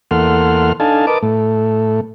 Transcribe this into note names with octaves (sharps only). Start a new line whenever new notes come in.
E2 A#3 A4 F#5 C6 F6
D4 D#4 A4 F5 G#5 A5
A#4 B4 D#5 A5 D6
A2 A3